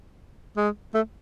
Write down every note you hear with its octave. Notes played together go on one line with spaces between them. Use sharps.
G#3
A3